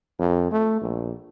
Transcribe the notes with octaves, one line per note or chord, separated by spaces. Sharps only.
F2
A3
A#1